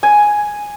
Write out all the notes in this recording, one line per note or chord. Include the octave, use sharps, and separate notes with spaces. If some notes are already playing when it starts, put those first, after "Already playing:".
G#5